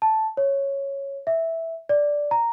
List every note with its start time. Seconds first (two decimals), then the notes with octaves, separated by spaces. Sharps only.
0.02 A5
0.37 C#5
1.27 E5
1.89 D5
2.31 A#5